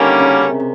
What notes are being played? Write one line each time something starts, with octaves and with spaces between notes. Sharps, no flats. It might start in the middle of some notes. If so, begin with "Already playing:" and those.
Already playing: D3 D#3 G3 A#3 C#4
C#3
C3
C3